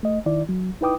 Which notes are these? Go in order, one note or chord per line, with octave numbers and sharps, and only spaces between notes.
A3 D#5
D#3 E4 D5
F#3
D#4 E4 B4 G5 D6 D#6